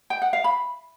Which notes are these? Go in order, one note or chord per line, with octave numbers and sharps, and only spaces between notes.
G5
F#5
F5
B5